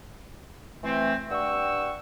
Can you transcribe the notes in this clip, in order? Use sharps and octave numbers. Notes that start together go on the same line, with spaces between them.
E3 A3 C4
G2 F#5 G5 C#6 E6